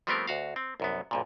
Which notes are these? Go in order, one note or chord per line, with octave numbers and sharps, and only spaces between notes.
F3 G3 A3 B3 C4 A#4
D2 F#4 F5
C4
C2 F#2 B3
B1 G2 A#2